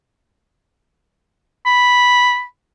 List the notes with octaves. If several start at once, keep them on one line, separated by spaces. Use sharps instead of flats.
B5